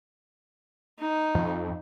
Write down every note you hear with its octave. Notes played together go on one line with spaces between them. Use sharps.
D#4
F2